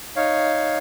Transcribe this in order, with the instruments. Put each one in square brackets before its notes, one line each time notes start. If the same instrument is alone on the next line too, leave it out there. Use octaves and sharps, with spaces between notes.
[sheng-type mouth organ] D#4 C#5 F5